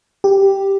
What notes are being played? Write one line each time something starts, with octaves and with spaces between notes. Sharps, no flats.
G4